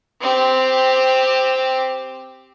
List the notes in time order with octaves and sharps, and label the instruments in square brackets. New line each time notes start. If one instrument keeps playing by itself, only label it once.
[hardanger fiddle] C4 G4